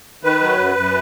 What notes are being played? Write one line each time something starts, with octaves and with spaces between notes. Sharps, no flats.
D#3 B4
F#3
F#2
F#2